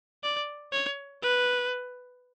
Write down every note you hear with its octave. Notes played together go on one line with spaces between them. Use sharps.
D5
C#5
B4